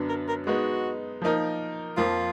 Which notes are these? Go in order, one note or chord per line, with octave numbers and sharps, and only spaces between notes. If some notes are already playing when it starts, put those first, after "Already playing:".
Already playing: F#2 D3 F#3 B3 D4
A#4
A#4
G#3 B3 D#4 F#4
F3 A#3 D#4 A#4
F2 F3 A#3 F4